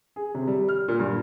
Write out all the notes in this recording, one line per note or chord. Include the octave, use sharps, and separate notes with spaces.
G#4
C3
G3
F6
A#2
G2